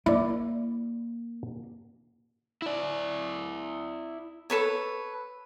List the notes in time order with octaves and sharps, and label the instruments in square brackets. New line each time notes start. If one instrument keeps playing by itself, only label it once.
[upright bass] A#3 [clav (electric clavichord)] E4 D5
[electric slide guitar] E4 D5
[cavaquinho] A4 B4 C#5